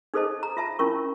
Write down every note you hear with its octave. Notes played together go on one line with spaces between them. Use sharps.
D#4 G#4 A4 C5 D#5 A5
A#5
F4 E5 A5
C#4 D4 E4 F4 A#4 C#6